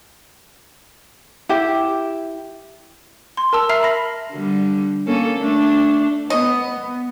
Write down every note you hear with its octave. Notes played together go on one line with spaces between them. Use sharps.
E4 G4
C6
A#4 A5 E6
E5 A#5 F6 C7
B5 A#6
D3 G3
A#3 C#4 A4
A3 D4
B3 D#5